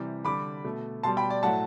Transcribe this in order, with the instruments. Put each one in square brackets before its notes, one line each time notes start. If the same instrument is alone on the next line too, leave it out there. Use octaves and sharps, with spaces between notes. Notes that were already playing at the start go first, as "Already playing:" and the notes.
Already playing: [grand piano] C3 E3 G3
D3 G3 B5 D6
B2 A3
B2 G3 A5 C6
G5 B5
D5
A2 F#3 A3 F#5 A5